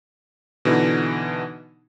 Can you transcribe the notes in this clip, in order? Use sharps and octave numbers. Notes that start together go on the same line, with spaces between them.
B2 D3 E3 D4 D#4